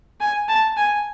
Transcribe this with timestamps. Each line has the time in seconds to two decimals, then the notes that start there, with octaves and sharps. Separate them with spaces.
0.20 G#5
0.48 A5
0.77 G#5